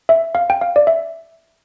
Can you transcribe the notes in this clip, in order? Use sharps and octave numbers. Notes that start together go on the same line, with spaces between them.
E5
F5
G5
F5
D5
E5